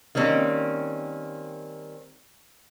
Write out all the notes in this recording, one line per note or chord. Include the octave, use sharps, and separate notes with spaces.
D#3 G3 A#3 C4 C#4